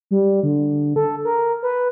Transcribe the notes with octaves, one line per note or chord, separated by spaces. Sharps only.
G3
D3
A4
A#4
B4